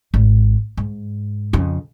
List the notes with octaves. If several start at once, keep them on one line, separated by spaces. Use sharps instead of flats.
G#1
G#2
F2 C#3